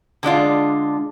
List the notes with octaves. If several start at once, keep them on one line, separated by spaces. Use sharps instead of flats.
D3 G#3 D4 F4